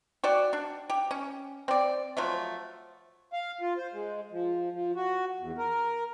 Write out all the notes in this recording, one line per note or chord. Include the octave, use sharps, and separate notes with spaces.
F#4 G4 D5
D4
G4
C#4
C4 D5
F3 F#3 A3
F5
F4
C5
G#3
F3
F3
F#4
E2
A#4